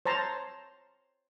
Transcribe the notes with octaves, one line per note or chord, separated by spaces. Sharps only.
C5 C#5 A5 A#5 C6